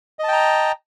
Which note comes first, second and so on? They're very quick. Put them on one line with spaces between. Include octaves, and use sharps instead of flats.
D#5 A5 G5 A#5